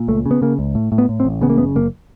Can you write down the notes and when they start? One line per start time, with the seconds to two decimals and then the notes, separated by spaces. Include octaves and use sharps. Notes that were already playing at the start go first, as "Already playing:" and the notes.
Already playing: A#2
0.08 C#2 A3
0.26 C#3
0.31 B3
0.42 C#3 A#3
0.59 C#2
0.75 A2
0.92 A2
0.98 B3
1.09 A2
1.20 C4
1.25 A1
1.42 C#3 B3
1.50 A#3
1.58 F#1 B3
1.75 F#1 A#3